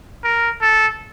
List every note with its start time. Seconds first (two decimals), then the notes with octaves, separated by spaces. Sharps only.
0.24 A#4
0.62 A4